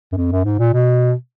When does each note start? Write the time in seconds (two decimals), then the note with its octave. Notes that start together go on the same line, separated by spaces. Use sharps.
0.13 F#2
0.18 F2
0.32 F#2
0.45 G#2
0.59 A#2
0.74 B2